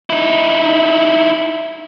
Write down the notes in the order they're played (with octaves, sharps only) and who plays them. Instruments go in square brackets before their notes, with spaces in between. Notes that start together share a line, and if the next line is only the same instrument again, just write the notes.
[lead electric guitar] D#4 E4